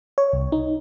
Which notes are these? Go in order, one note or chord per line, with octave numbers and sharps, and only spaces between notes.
C#5
C2
D#4